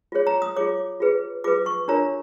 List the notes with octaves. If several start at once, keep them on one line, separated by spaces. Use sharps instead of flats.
F4 G#4 C#5
A#5
D#6
F4 G#4 C#5 D6
F4 G#4 B4
F4 G#4 B4 D6
C#6
D4 F4 A#4 C#5 A#5